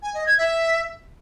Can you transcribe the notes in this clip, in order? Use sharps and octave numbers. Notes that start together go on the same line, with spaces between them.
G#5
D#5
G#6
E5